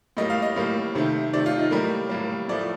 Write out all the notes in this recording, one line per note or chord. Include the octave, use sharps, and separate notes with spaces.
A2 G3 A#3 D#5
F5
D#5
A2 G3 A#3 F5
C3 D#3 A3
C3 D#3 A3 D5
F4
D#4
A2 G3 A#3 A#4
A2 G3 A#3
A2 F3 A3 D5